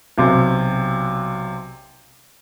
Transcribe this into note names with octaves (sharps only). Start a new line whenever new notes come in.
B1 C3